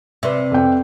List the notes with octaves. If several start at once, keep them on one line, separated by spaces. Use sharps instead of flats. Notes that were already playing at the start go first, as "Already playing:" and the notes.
C3 B4 D5 E5
F2 G5